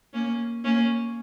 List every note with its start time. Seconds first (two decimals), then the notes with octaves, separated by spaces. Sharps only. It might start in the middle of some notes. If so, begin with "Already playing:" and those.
0.14 A#3 C#4
0.64 A#3 C#4